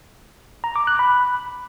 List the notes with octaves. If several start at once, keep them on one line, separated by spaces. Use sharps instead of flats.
A#5
D6
F#6
B5